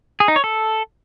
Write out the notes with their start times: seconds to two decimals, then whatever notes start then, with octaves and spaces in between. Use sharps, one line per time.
0.20 G#4
0.28 D#4
0.36 C#5
0.44 A4